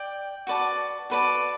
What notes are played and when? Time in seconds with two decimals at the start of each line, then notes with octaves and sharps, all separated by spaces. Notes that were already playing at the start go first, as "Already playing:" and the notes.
Already playing: D5 G5
0.47 F#4 B4 D5 A5
1.10 F#4 B4 D5 A5